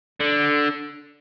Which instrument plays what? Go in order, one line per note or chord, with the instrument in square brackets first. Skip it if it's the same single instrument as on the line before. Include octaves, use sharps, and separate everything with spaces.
[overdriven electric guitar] D3